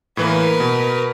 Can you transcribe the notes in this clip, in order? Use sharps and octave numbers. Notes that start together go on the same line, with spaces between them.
A2 E3 A#3 A#4 B4
B2